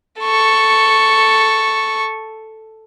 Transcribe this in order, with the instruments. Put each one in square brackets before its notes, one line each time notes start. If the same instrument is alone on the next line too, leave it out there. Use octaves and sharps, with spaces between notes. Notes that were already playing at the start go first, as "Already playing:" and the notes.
[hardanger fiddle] A4 C#6